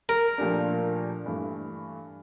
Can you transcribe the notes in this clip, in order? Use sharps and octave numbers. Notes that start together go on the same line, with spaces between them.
A#4
A#2 F3 A3 D4 G4
G2 E3 A3